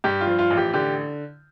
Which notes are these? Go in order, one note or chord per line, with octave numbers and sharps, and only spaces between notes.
G2 G4
F4
F3
F4
A1
G4
D3 G4